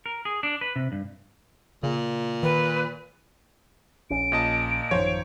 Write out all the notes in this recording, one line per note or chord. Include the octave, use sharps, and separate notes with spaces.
A#4
G#4
D4
B4
C3
G2
A#2 C#3
D#3 B4
A#1 C#4 D7
A#2 D#5 A5
A1 F#2 D#3 F3 C5 C#5